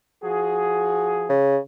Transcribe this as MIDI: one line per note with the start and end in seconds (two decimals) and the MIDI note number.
0.22 1.36 53
0.22 1.36 66
0.22 1.36 68
1.29 1.58 49